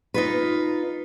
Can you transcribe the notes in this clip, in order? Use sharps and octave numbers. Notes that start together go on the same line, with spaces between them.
D#4 F4 B4